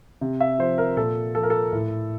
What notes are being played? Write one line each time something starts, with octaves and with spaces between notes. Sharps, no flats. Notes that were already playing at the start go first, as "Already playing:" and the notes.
C3
E5
F3 C5
A#4
A#2 A4
F3 A4
A#4
A4
A2